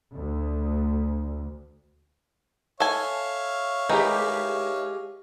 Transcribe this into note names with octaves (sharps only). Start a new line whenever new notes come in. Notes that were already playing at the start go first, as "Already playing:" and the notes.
D2
A4 C#5 E5 F5 G#5
D#3 E3 G#3 D#4 G4